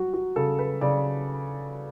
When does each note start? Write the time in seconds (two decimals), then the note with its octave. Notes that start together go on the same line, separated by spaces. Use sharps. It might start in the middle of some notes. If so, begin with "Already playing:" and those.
Already playing: F#3 F#4
0.14 F#4
0.36 C#3 A4
0.59 B4
0.81 C#3 D5